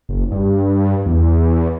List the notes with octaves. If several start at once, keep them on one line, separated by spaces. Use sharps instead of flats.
F#1
G2
E2